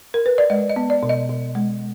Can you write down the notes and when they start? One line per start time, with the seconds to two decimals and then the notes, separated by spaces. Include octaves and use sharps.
0.14 A#4
0.26 B4
0.38 D5
0.50 G#3 D#5
0.70 D#5
0.76 B3
0.90 D5
1.03 B2
1.09 D#5
1.29 B2
1.55 G#3